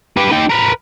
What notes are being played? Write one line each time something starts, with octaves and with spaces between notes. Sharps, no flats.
G4 B4
D#4 G4
A#4 B4